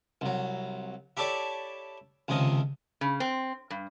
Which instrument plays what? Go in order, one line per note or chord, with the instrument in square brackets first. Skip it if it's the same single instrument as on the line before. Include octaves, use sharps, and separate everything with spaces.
[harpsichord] C2 F#3
E4 G4 A4 C#5 D5 A5
C#2 C3 D#3 F3 D#5
[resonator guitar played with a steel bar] C#3
C4
G2